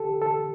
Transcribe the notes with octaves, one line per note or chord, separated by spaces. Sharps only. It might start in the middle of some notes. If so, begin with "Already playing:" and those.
Already playing: G4 A4
A4